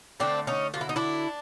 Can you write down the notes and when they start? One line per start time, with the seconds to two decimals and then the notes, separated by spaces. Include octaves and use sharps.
0.20 D3 F#3 A3 C4 D4
0.47 C#4 D#4
0.74 D3 F#3 A3 F4
0.81 E4
0.89 D#4
0.96 D4 E4